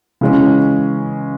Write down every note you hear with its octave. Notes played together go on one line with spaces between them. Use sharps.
C#3 E3 G#3 C#4